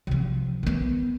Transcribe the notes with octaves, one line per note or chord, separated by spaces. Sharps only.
C3 F3
D#3 B3